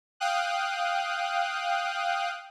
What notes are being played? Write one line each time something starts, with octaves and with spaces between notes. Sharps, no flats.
F5 G5 D#6 F#6